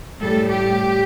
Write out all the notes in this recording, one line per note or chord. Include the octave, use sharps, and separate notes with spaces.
A2 G3 A4
G4